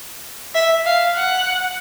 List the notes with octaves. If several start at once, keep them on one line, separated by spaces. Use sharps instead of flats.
E5
F5
F#5